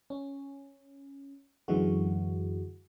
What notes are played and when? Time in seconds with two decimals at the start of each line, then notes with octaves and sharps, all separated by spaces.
0.10 C#4
1.68 F#2 D3 E3 G#3 F#4